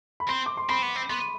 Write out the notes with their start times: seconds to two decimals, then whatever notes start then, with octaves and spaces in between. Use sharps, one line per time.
0.20 B5
0.28 C4 C6
0.46 D6
0.57 C6
0.69 C4 B5
0.83 B3
0.96 C4
1.10 B3 C6